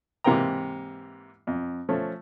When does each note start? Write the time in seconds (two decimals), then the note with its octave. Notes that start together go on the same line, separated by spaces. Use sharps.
0.24 G#2 C3 E3 A#3 G5 A#5
1.47 F2
1.89 F3 A3 C#4